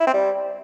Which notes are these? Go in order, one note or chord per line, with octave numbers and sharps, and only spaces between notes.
E4
C4
G3